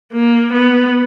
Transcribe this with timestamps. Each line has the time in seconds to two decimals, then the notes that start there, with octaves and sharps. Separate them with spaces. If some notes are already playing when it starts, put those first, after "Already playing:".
0.13 A#3
0.53 B3